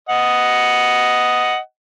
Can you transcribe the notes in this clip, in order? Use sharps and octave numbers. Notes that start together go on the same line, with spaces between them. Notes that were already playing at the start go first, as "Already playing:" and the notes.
D#5 F#5